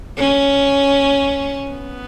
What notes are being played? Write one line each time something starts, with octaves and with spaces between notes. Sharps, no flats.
C#4
B3